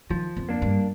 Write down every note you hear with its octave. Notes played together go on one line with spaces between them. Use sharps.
D#3 F3
F2
A#3 D4
G2